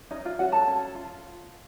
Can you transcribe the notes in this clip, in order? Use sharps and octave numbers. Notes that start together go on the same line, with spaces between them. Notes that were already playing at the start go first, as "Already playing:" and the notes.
C#4 D#4 D#5
F4 F5
C#4 F#4 F#5
A4 A5
C#4
F4